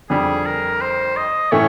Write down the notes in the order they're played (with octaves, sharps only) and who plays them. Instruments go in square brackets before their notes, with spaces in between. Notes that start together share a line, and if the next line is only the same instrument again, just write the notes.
[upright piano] F2 D3 G3 [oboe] G#4
[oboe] A#4
C5
D#5
[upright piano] A2 E3 A3 C#4 [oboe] C#5